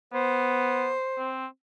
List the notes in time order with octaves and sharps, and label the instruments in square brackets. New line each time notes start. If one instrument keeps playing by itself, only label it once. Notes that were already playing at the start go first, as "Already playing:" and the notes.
[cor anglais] B3 [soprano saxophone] C5
[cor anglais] C4